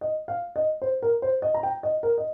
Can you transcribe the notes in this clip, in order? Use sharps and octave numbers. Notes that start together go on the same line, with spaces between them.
D#5
F5
D#5
C5
A#4
C5
D#5
A#5
G5
D#5
A#4
D#5